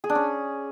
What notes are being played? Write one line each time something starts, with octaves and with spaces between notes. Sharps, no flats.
G#4
D4
C#4